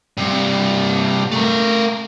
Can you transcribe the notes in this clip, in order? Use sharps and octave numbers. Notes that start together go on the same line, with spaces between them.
G2 C3
A3 A#4